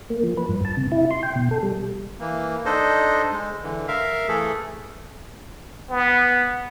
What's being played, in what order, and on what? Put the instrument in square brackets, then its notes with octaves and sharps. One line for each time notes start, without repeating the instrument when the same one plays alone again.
[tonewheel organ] A#3
F3
B4
G2
A5
C3
E4
C6
G5
B2
A4
G3
[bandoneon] E3 A#3
D4 D#4 A4 C5 D#5
G#3
D3 E3
A#4 E5 F5
E3 A3 G#4 A4
[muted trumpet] B3